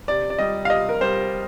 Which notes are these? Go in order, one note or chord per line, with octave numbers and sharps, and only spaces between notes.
C3 D5
D5
G3 D#5
F5
C3 D#5
A#4
G3 C5